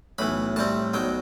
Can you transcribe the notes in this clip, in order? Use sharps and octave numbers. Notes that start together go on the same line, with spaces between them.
B1 A2 E3 B5
A2 G3 C4 A5
B1 B2 F#3 G5